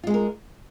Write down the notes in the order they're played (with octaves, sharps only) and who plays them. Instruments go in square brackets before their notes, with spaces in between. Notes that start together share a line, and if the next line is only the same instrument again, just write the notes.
[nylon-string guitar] F4
G#3
G#4
A#4